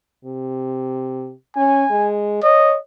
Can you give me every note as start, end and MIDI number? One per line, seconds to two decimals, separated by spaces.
0.24 1.32 48
1.56 1.84 61
1.56 2.11 80
1.91 2.41 56
2.43 2.76 73
2.43 2.78 75